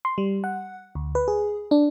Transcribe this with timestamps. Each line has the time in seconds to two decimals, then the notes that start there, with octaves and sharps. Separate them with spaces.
0.05 C6
0.18 G3
0.44 F#5
0.95 D2
1.15 B4
1.28 G#4
1.71 D4